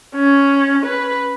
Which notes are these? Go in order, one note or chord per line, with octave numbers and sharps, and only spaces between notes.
C#4
B4